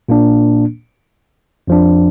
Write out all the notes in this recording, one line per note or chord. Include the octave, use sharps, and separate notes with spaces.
A#2 A#3 D4
F2 F3 D4